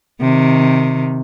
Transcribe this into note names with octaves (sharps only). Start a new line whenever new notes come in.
C3 D#3